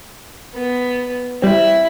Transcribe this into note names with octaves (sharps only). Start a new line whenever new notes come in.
B3
G3 C4 E4